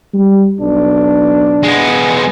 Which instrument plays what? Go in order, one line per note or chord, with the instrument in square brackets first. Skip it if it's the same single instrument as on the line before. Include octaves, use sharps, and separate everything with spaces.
[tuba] G3
[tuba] B1 [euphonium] D4
[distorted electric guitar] G#3 B3